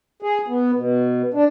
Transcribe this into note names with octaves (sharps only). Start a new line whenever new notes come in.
G#4
B3
B2
D4